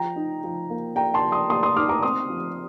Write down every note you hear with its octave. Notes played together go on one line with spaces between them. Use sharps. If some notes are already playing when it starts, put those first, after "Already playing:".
Already playing: F3 G5 A#5
D#4
F3
A#3
A#3 G5 A#5
A5 C6
F3
C6 D#6
A#3 C6 D#6
C6 D#6
D#4 D6 F6
A#5 D6
C4 C6 D#6
F3